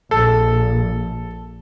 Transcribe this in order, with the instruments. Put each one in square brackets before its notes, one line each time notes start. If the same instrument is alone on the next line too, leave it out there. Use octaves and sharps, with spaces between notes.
[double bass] A#1 [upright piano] A4